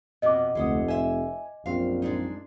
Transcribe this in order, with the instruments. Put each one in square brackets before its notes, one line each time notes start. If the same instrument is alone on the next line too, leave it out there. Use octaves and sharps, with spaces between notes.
[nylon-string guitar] F2 B2 [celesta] D#5 D6
[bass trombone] F1 [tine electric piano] D2 A3 D#6 [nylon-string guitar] G#3 A4 F#5
[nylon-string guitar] C5 E5 [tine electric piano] G#5
[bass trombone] A#1 [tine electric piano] F#2 C4 F4 [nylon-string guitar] F5
[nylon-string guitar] G#3 D4 D#4